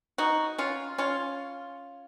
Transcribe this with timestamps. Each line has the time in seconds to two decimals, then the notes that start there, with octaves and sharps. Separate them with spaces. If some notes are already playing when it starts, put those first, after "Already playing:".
0.18 D#4 F#4
0.58 C#4 F4
0.98 C#4 F4